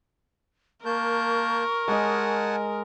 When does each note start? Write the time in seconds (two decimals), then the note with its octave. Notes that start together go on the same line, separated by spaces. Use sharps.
0.86 A#3 A#4 A5 C#6 G6
1.88 G#3 D#5 F#5 G#5 A5